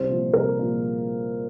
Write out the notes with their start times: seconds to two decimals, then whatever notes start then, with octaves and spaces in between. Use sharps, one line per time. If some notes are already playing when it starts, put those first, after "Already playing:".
Already playing: C2 C5
0.09 A#2 F3
0.33 C2 A#4
0.59 A#2 F3